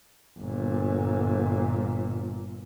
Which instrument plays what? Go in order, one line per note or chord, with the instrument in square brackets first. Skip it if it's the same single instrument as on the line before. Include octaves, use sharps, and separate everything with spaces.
[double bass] G1 A#2